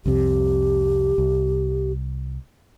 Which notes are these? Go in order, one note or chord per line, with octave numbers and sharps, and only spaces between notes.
C2 F2 C3 G4
C2